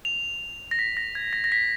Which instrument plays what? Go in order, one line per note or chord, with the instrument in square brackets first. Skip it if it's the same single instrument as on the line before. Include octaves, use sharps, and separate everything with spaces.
[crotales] F7
A#6
B6
A#6
G#6
A#6
A#6
B6